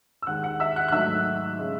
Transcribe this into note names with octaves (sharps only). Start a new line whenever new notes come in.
E6
D#2 D#3 G#3 F#5 F#6
F#5 F#6
E5 E6
F#5 F#6
F#6
G#2 D#3 F#3 A3 E5 E6
C#3 G#3